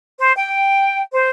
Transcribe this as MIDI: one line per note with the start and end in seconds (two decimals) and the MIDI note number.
0.19 0.33 72
0.36 1.01 79
1.12 1.29 72